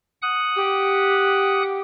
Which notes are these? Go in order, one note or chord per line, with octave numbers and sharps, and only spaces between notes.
F#5 D#6 F#6
G4